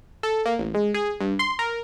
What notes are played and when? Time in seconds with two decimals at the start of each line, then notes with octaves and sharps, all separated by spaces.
0.23 A4
0.46 A#3
0.59 A1
0.74 G#3
0.94 G#4
1.21 G2
1.39 C6
1.59 A#4